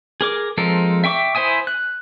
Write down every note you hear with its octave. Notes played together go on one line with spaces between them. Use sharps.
G#4 A#4 D6
F3 G#3 C4 A4 A#4
E5 G5 C#6 D6
E4 C5 E5 G#5 D#6
F#6